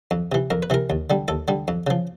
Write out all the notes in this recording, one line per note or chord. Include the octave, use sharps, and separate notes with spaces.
F2
C3 E3
F2 A#4
B4
C3 E3 A#4
D#2
D3 G3
D#2 A4
D3 G3
F2
C#3 F3